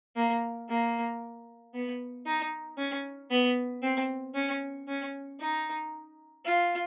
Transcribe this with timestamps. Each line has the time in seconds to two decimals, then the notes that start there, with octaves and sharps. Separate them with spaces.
0.16 A#3
0.69 A#3
1.74 B3
2.26 D#4
2.78 C#4
3.30 B3
3.83 C4
4.35 C#4
4.88 C#4
5.40 D#4
6.45 F4